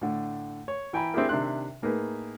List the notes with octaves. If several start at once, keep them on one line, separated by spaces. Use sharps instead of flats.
A2 D3
C#5
E3 G5 G#5 A#5 B5
C4 D4 E4 G4 G#4 A#4
C3 D#3 D4 E5 C6 F#6
A2 A#3 D#4 G#4 B4